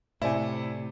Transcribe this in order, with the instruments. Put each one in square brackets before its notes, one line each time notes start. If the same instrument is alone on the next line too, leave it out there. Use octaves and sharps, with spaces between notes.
[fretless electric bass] A2 [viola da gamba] C3 [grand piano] E4 [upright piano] C5 D5 G#5